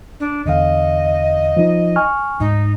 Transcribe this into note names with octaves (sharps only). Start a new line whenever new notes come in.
D4
E2 D3 D#5 F5
F3 D#4
G#5 C#6 F6
D2 G#2 D#4